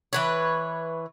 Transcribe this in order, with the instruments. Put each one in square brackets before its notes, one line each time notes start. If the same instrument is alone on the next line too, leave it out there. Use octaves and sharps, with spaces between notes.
[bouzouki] E3 B4 C#5